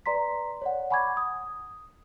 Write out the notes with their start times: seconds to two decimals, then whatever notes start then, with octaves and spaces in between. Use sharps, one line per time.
0.06 B4 D5 A#5 C6 B6
0.62 C#5 D5 F#5
0.90 F#5 G#5 B5 C#6 D6 G#6
1.17 D#6